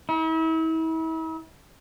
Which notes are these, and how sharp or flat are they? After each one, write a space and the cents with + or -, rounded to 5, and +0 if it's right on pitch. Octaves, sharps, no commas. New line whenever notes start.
E4 -40